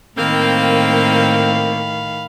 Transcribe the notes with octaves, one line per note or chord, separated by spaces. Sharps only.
A2 D#3 A#3 C4 F5 B5